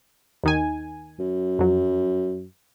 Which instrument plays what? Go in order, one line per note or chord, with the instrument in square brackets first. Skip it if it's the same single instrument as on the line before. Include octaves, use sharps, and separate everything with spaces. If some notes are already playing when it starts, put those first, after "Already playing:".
[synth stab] D#2 D#3 G#5
[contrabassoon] F#2
[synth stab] F2 F#3